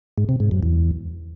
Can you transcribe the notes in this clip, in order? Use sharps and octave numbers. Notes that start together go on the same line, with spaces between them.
G#2
C3
G#2
F#2
E2